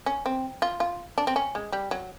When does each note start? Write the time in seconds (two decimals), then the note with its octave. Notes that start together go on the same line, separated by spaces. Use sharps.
0.06 C#4
0.26 C4
0.62 F4
0.80 F4
1.18 D4
1.27 C4
1.36 C#4
1.55 G#3
1.72 G3
1.91 F#3